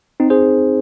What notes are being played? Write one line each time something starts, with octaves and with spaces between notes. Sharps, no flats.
C4 D#4
G#4 C5